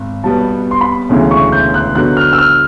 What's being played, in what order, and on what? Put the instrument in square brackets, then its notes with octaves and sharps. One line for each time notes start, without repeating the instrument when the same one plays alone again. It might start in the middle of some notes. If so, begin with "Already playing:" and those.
Already playing: [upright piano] G#1
[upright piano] B1 B2 G3 B3 [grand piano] A5
[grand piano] C6
B5
[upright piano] E1 D2 C#3 E3
[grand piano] C#6
G6
F#6
[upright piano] D3 F#3 B3 D#4 F#4 [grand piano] F#6
[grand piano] F6
E6
F6